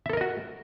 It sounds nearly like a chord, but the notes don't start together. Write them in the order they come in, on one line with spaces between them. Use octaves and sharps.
E5 A4 A#4 D#5 F#4